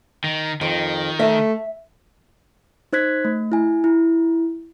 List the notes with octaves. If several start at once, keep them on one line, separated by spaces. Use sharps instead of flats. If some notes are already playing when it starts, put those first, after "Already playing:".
D#3
F2 D#3
A3 E5
D#4 C5 F#6 G#6 B6
A3
E4 G#5
E4